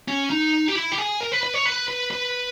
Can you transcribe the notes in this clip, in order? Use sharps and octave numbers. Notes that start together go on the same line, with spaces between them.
C#4
D#4
G4
E4
G4
G#4
A#4
B4
B4
C#5
B4
B4
B4